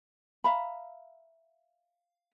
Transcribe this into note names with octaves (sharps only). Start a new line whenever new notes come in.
E5 F5 A#5 B5